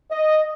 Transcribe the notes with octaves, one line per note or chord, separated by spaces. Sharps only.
D#5